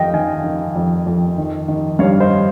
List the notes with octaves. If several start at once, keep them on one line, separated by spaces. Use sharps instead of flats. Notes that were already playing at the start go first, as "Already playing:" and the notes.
Already playing: F2 D#3 D#5 F5 G5
D#3 F5 G#5
D#3
F2
F2
D#3
D#3
G2 C#5 F5
C5 D#5